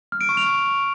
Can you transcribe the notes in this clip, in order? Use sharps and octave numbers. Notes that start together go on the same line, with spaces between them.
F6
D7
C#6
F7